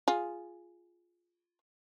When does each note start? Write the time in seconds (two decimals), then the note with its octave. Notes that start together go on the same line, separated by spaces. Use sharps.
0.08 F4 G#4